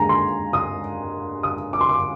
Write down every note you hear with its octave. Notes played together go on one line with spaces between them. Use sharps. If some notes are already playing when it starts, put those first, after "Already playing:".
Already playing: D#2 D3 G#3 G#5 A#5
C6
D#6
D#6
D6
C6
D6